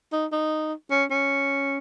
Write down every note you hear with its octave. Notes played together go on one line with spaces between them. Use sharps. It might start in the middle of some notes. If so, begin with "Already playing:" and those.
D#4
D#4
C#4
C#4